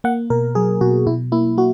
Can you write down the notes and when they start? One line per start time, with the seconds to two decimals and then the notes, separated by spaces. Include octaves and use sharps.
0.04 A#3 F#5
0.30 B2 A#4
0.55 F#3 G#4
0.81 B2 F#4
1.07 B2 E4
1.32 A#3 E4
1.57 A#3 F#4